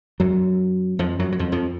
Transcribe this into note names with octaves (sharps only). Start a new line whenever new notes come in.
F#2 F#3
F2 F3
F#2 F#3
F#3
F2 F3
F2 F3